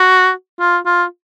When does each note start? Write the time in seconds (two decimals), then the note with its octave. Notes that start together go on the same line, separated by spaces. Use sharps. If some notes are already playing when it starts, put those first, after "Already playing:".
Already playing: F#4
0.59 F4
0.86 F4